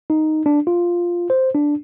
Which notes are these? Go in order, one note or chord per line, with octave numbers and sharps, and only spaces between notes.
D#4
D4
F4
C5
D4